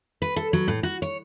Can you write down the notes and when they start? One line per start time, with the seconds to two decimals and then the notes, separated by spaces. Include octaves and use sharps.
0.22 B4
0.36 A4
0.53 F#3
0.68 A2
0.83 F#4
1.02 C#5